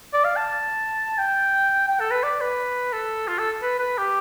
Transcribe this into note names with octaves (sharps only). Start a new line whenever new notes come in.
D5
F5
A5
G5
G5
A4
B4
D5
B4
A4
F4
A4
B4
B4
G4